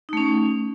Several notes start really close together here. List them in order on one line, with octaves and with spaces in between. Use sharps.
D#4 A3 C#4